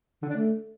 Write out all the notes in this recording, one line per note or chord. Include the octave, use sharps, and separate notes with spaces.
D3
D4
A3